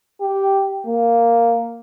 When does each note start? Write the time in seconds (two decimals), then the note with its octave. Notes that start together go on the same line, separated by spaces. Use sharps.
0.21 G4
0.86 A#3